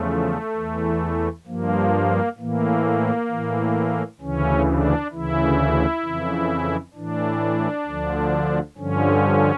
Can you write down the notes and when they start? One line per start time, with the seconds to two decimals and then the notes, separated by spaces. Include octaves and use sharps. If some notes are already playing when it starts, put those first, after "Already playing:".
Already playing: E2 C#3 F3 A3
0.56 E2 E3
1.47 G2 F3 A#3
2.38 A2 E3 A#3
3.29 A2 E3
4.21 D2 C#3 E3 C#4
4.67 D4
5.12 D2 C#3 E3 E4
6.04 F2 C#3 E3
6.94 A2 E3 D4
7.86 D2 D3 F3
8.78 G2 D3 F3 C#4